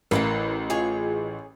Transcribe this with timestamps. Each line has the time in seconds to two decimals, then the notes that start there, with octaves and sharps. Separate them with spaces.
0.11 A1 E3 A#3 A#4 B4 A#5
0.70 F4 G#4 C#5 D#5